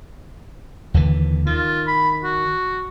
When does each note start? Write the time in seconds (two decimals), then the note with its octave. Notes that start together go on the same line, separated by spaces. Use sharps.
0.94 D#2 D3 E3
1.46 D#3 F4
1.87 B5
2.23 F#4